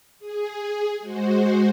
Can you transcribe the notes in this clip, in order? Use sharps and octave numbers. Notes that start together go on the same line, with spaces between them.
G#4
G#3 F#4 C5